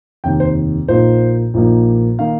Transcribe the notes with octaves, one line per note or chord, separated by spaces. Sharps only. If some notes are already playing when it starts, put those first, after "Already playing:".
F1 D#2 D#3 G5
C5
A#1 A#2 F3 A#3 D#4 C5
A#1 A#2 F3 A#3 D#4
D#3 A#3 D#4 F5